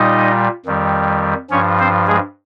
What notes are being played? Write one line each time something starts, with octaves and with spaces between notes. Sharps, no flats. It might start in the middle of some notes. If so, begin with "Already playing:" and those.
Already playing: A#2 G3 D#4 D#5
F2 D#3 G3
G2 F3 C#4 C#5
C4 C5
G#3 G#4